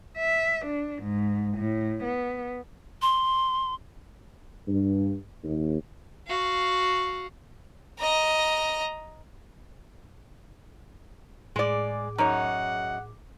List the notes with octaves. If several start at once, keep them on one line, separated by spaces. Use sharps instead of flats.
E5
D4
G#2
A2
B3
C6
G2
D#2
F#4 F5
D#5 A#5
A2 G#3 G#4 D5 D6
F#2 D#4 A#4 C#5 F#5